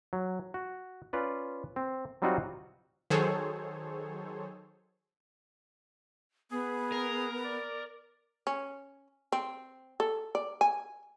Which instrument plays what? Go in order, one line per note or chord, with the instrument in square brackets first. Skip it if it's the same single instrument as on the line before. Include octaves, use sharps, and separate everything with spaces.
[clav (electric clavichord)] F#3
F#4
C#4 F4 B4 D5
C4
F#3 G3 C4 D#4 F4 F#4
[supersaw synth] D#3 F#3 G#4 A4 C5 C#5
[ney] B3 [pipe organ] G#4
[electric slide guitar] A#4
[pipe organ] D5
[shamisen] C#4
C4
A4
D5
G#5